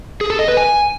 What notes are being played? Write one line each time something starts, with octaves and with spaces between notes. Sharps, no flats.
G#4
A4
D#5
B4
G#5